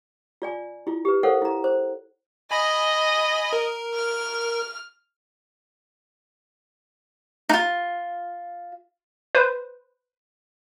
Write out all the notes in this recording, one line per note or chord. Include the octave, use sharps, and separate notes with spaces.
F4 D5 G#5
E4 F4
G4 B4
A4 A#4 C5 C#5 F5 F#5
E4 A#5
C5
D#5 G#5 B5 A#6
A#4
F6
D#4 F4
B4 C5